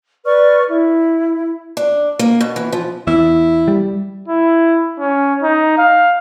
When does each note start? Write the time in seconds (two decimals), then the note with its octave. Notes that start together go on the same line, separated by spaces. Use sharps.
0.25 B4 D5 C#6 F6
0.68 E4
1.77 D4
2.19 A#3
2.41 B2
2.56 E3
2.72 F3
3.07 E2 E4
3.68 G3
4.28 E4
4.99 C#4
5.43 D#4
5.78 F5